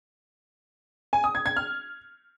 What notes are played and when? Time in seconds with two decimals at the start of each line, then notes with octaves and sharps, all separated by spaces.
1.13 G#5
1.24 D#6
1.35 G#6
1.46 G#6
1.57 F6